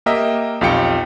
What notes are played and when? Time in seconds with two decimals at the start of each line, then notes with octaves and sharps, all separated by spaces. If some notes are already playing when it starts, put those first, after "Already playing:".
0.06 A#3 G4 A#4 D#5 E5
0.61 B1 F2 F4 G4 G5 C#7